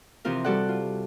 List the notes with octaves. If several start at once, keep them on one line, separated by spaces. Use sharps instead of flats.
C3 E3 F3 C4 F4 A#4
G3 F#4 A4 D5 F#5
F4